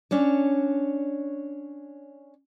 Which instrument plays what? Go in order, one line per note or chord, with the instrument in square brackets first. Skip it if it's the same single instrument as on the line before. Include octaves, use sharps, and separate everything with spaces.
[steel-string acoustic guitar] C#4 D4 C#5